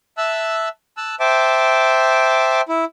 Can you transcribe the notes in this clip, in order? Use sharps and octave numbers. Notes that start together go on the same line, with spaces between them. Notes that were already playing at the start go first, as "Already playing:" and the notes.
E5 A5 E6 F#6
A5 E6 F#6
C5 E5 G5 A5 D6
E4